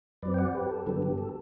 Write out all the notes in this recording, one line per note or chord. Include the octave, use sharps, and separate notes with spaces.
F#2 F#3 C4 B4 D5
G5
D5 F#5
G4 B4
A4
G2 D3 F#3 B3 A4
G4
A4